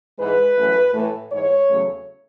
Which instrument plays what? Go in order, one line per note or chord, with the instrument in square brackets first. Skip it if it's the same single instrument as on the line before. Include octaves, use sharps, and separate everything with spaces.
[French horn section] G#2 E3 G#3 B4
F#2 E3 A3
A2 E3 A3
G#2 E3 G#3 C#5
E2 C#3 F#3 A3